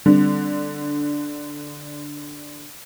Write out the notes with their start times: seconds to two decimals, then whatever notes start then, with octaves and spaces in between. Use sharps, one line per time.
0.06 D3 G3 C4